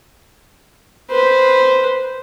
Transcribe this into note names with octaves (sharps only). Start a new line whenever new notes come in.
B4 C5